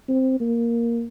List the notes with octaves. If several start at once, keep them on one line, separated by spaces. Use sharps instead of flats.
C4
A#3